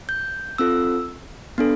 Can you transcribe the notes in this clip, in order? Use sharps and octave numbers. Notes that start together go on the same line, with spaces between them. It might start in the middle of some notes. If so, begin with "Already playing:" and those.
G6
C4 F4 A4 E6
B3 D4 A4